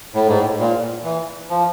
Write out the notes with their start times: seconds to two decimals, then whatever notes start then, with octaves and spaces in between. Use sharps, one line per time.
0.14 A2
0.27 G#2
0.40 A2
0.59 A#2
1.04 E3
1.50 F3